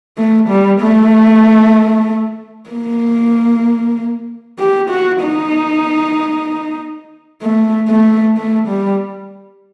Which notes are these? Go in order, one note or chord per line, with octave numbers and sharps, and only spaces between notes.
A3
G3
A3
A#3
G4
F#4
D#4
A3
A3
A3
G3